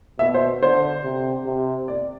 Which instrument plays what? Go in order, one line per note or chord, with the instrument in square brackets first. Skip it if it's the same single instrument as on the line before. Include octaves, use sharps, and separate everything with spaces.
[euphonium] B2 [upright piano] E5
[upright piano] C5
[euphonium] D3 [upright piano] C5
[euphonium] C3
C3
[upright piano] D5